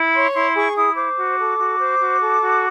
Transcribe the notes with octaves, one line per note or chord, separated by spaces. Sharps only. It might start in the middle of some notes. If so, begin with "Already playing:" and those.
Already playing: E4
C#5 C6
E4 C6
G#4 C#6
E4 D#6
C5 D6
F#4
A4
F#4
C5
F#4
A4
F#4